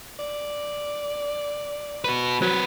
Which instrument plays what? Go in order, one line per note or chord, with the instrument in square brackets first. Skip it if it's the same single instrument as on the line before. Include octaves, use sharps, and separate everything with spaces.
[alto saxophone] D5
[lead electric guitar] F#4 B4
[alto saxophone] F#3 [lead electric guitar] C4 B4